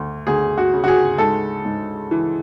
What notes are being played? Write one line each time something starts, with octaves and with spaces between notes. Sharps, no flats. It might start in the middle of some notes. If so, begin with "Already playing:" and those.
Already playing: D2
D2 G#4
F#4
C#3
F#4
G#4
G#2 A4
G#2
E3